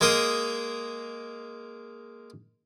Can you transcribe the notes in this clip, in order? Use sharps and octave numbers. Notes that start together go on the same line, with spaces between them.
G#3 A#3 A#4 C6 D#6